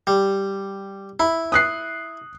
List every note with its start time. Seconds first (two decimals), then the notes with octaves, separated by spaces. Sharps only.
0.07 G3
1.20 E4 B5
1.52 D#6 F#6 C7